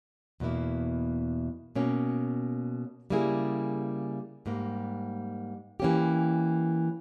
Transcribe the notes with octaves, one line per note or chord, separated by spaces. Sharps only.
E2 B2 A#3 E4
B2 A#3 C#4
C#3 G3 A#3 E4 G#4
G#2 G3 A#3
E3 A#3 C#4 G4